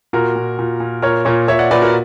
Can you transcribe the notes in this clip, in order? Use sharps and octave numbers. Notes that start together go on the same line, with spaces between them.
A#2 F#4 A#4
A#2
A#2
A#2
A#2 A#4 C#5
A#2 A#4 C#5
A#2 C#5 E5
D5 F#5
A#2 B4 D5
F#4 A#4